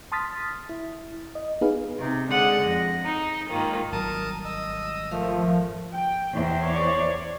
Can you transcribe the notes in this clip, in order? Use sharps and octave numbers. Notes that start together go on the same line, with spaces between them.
A5 C6 D#6 F6 A6 B6
E4
D#5
B3 D#4 G#4 B4 F5
C3 D#4
D3 G#3 F#5 D#6
F2 A#6
D#4
G#2 D#3 A#3 F4
G#1 F#3 G3 A#4 A5 D#6
D#5 D#6 E6
F3 A3 A#4 F5
G5
E2 C5
C#5 D5